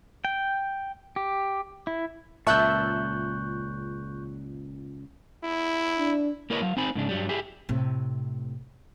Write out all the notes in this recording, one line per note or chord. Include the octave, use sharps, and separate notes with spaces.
G5
G4
E4
C#2 A#2 E5 A5 C#6 E6 F#6 G6
E4
D4
A#3 E4 A#4 B4 C#5 D#5
F#3 F5
C4 D#4 C5 G#5 B5
G#2 C#3 D4
G2 F#3 G3
E4 G4 G#4
A2 C3